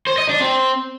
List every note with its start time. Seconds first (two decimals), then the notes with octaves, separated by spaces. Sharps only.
0.07 C5
0.18 D#5
0.29 D4
0.41 C4